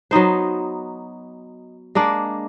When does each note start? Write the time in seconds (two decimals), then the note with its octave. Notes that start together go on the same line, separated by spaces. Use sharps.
0.11 F#3 B3 D#4 C5
1.95 G#3 A#3 D4